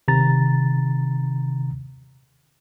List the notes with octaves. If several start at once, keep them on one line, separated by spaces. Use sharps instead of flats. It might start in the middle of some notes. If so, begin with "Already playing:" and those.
C3 D#3 A#5 A6